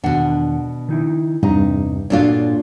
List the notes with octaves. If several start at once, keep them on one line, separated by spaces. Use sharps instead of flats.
E2 B2 D#3 D4 F#5
D#3 D#4 E4
E2 G2 C3 D#4 A#5
A#2 D4 F4 F#4 A4 C#5